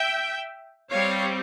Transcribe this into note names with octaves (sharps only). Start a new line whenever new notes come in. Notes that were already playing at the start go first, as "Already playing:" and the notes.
Already playing: E5 G5
G3 C4 C#5 F5